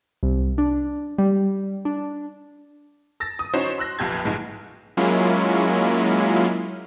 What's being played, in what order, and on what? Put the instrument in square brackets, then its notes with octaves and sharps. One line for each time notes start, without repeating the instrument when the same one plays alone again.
[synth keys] C2
D4
G3
D4
[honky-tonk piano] E6 A6 A#6
D#6
C#4 D#4 E4 F#4 C5 C#5
C6 E6 F#6 A#6
F1 A#1 F2 G4 G6 G#6
A#1 G#2 G#3
[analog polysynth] F#3 G#3 A#3 C#4 E4 F4